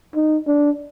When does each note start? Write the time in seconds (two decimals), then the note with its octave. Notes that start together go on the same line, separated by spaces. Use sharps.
0.15 D#4
0.47 D4